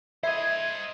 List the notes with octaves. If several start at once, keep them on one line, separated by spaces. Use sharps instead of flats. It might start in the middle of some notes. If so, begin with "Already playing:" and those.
C5 D#5 E5 G#6